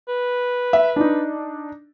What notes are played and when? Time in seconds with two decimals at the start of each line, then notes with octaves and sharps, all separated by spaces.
0.08 B4
0.73 E5
0.96 D4 D#4